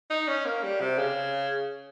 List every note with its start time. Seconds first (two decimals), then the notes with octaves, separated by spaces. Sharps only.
0.10 D#4
0.28 C#4
0.45 A#3
0.63 G3
0.81 C3
0.98 C#3